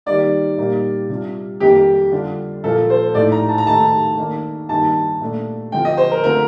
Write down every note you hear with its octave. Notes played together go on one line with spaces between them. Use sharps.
D#3 G3 A#3 D#4 D5
A#2 G3 A#3 D#4
C3 G3 D4 F4
F2 D#3 G3 A#3 D#4 G4
D3 G3 D4 F4
A#2 F3 A#3 F4 A4
C5
A2 A3 D#4 D5
A#5
A5
A#5
D#3 A3 D#4 A5
D#3 A#3 D4
G2 D#3 A#3 D#4 A5
A#2 A3 D4
D3 F3 C4 F4 G5
D#5
C5
A#4
D3 A3 C4 F4 A#4